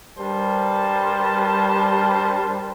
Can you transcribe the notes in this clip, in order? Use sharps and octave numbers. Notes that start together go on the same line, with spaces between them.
G2 G3 A#4 C5 A5